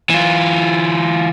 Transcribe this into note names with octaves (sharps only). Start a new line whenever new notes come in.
E3 F4